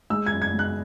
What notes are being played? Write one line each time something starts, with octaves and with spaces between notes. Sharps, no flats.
G#3 E6
G#6
F#2
G#6
G#3
F#6